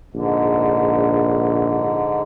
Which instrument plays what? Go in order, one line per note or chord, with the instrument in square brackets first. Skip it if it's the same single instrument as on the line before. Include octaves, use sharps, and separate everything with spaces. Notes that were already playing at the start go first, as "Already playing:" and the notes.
[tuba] A#1 [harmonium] G#2 D3